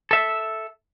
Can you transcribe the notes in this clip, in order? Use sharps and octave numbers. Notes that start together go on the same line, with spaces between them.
A4 E5